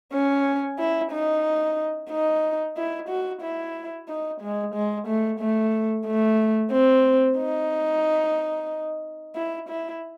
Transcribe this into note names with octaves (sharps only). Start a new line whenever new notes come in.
C#4
E4
D#4
D#4
E4
F#4
E4
D#4
G#3
G#3
A3
A3
A3
C4
D#4
E4
E4